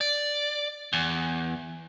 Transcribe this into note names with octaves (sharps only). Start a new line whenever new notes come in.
D5
E2